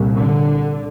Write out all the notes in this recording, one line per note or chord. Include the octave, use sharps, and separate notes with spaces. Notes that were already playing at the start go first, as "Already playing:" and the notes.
Already playing: C2 A#2
D3